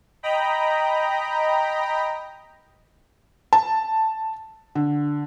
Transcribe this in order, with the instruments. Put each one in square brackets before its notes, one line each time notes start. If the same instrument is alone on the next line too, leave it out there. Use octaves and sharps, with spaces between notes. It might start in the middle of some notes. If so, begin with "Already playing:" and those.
[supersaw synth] D#5 G5 A#5 B5
[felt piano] A5
D3